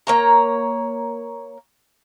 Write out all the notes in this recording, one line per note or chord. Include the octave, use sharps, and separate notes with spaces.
A#3 C#5 A#5